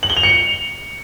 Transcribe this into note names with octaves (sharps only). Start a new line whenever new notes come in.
F#7
G7
F7
C#7